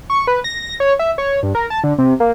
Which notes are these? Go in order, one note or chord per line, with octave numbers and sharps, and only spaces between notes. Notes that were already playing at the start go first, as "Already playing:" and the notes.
C#6
B4
A#6
C#5
E5
C#5
G2
A#4
A5
D3
C3
A#3